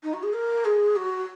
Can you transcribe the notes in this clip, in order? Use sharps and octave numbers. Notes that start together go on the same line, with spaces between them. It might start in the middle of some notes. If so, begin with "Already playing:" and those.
D#4
F#4
G#4
A#4
G#4
F#4